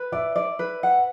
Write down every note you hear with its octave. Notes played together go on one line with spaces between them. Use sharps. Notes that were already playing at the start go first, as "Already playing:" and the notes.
Already playing: B4
D5 E5
D5
B4
F#5